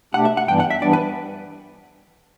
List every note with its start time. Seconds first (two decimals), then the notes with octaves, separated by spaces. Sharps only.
0.14 B2 A3 D4 G4 F#5
0.25 E5
0.37 F#5
0.48 G2 E3 G3 B3 D4 G5
0.60 F#5
0.70 E5
0.82 G2 E3 G3 B3 D4 D5
0.93 B4